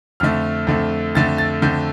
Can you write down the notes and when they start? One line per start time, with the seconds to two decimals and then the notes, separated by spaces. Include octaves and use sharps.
0.20 F2 D3 A3 F6
0.67 F2 D3 A3
1.15 F2 D3 A3 A6
1.38 A6
1.62 F2 D3 A3 G6